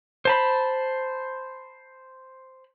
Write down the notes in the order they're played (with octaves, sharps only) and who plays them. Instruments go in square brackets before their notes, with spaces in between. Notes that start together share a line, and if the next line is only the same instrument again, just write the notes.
[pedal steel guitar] C5 A5 B5